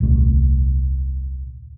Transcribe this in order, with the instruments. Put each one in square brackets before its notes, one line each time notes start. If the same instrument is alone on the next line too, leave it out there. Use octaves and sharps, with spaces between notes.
[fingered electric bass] D#1 C2 A3